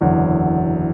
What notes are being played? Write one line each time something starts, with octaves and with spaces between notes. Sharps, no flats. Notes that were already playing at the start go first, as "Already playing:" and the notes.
F#1 E2 D3 F#3